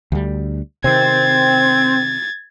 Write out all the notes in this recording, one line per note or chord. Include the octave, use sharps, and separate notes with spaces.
D2 G3
C3 D#3 C4 G#6 A6